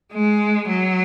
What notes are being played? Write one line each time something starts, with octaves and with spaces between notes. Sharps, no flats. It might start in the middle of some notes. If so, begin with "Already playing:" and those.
G#3
F#3